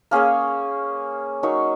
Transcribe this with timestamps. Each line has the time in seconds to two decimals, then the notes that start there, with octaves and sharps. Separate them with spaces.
0.11 A#3 C#4 G#4 C#5
1.43 F#3 D#4 A#4 C#5